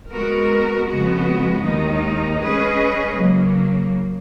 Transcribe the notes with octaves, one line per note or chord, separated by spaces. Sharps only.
G#3 B3 F#4 A#4
F2 C#3 G#3 B3 F#4
D#2 D#3 G#3 D#4
G#3 C#4 G#4 B4 D#5
C#3 F#3 A#3